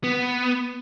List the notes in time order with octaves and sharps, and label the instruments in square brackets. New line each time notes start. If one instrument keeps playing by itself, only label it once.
[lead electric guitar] B3